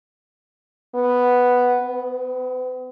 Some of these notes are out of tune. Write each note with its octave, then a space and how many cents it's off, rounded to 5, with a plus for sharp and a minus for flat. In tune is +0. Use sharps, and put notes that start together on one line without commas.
B3 +0
B3 +45